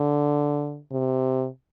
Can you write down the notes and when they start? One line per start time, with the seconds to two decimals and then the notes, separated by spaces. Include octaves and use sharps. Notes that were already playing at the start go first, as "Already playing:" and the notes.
Already playing: D3
0.92 C3